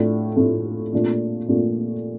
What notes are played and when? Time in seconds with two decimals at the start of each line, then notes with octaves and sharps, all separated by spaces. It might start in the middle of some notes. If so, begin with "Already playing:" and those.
Already playing: A2 A3 D4 F4
0.37 A2 A3 D4 F4
0.93 A#2 A3 D4 F4
1.48 A#2 A3 D4 F4